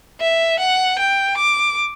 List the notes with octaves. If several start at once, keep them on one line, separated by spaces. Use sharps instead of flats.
E5
F#5
G5
D6